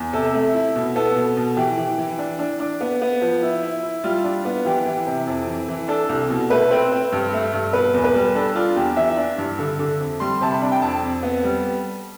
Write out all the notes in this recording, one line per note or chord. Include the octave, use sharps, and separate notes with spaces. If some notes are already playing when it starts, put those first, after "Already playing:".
Already playing: E2
C3 A4
A3
E4
B2
B3 A4
B2
B2
E3 G4
E3
E3
D4
D4
D4
B3
B3
F3
E4
E4
E4
G3 F4
D4
B3
E3 G4
E3
C3
F2
E3
E3
D4 A4
C2
B2
A3 B4
C4
C4
G2
A3
G2
B2 B4
E2
B4
G3
D4 A4
D4 F4
E2 G4
E3 E5
D4
G2
D3
D3
F2
G3 C6
C3 A5
B5
D4
G5
F2 A5
F2
B3
G3